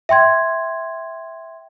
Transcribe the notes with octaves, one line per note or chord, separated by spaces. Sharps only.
E5 G5 C6 G#6